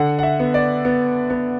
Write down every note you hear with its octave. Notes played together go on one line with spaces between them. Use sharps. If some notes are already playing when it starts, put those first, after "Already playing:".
Already playing: D3 F#5
F#5
E5
B3
D5
B3
B3